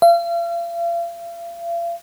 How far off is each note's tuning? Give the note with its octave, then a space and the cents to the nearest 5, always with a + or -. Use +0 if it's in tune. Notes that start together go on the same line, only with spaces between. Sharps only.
F5 -40